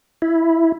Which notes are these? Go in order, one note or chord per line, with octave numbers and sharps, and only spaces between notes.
E4